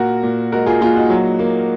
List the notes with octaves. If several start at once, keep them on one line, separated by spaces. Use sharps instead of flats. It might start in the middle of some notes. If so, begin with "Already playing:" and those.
Already playing: A#2 F#4 A#4
A#2
G#3 F#4 A#4
F4 G#4
A#2 F4 G#4
D#4 F#4
F#3
A#3